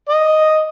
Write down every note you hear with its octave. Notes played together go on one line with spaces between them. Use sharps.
D#5